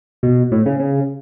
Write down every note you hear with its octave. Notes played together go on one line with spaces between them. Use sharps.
B2
A2
C#3
C#3